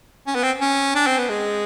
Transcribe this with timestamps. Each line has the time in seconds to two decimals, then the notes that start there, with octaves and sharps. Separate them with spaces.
0.27 C#4
0.35 B3
0.43 C4
0.61 C#4
0.96 D4
1.07 C4
1.18 B3
1.29 G#3